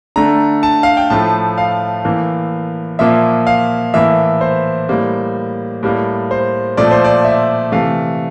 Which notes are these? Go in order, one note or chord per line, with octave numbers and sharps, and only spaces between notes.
D3 A3 A#5
A5
F5
G5
A2 F3 A3 A5
F5
A2 E3 A#3
A#2 F3 A#3 E5
F5
A2 E3 A#3 E5
C5
A2 G3 A#3
A2 G3 A#3
C5
A#2 F3 A3 D5
C5
D5
E5
C3 E3 A3 F5